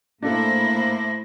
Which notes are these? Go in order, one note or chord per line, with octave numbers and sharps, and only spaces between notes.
A2 A#3 D4 E4 A4 C5 A#6